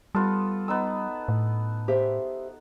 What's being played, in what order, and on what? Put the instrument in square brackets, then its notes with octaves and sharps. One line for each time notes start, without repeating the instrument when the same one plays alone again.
[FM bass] G3 [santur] B3 F4 A4
[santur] B3 D#4 E6
[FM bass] A2
[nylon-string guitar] G4 C5 E5